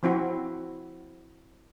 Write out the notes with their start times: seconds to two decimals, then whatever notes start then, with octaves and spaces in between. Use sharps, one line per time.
0.03 F3 C4 E4 F#4